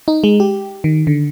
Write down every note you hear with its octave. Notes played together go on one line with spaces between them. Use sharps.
D#4
G#3
G4
D#3
D3